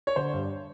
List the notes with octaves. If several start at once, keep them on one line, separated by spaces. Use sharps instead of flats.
C#5
D3 C5
G2